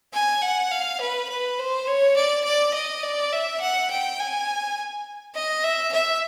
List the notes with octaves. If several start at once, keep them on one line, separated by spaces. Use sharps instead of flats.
G#5
F#5
F5
B4
B4
C5
C#5
D5
D5
D#5
D5
E5
F#5
G5
G#5
D#5
E5
E5